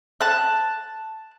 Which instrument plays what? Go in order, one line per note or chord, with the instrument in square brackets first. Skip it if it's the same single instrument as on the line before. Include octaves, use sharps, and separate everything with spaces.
[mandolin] A5 F#6